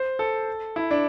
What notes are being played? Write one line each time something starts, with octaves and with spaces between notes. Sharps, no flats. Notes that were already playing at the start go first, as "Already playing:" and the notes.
Already playing: C5
A4
E4
D4